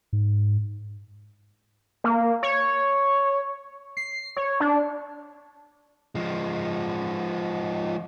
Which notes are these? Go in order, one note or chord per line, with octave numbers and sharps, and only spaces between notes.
G#2
A#3
C#5
C7
C#5
D4
F3 G#3